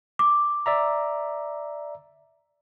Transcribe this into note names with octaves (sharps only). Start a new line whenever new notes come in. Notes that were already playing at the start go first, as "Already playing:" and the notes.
D6
D5 E5 A#5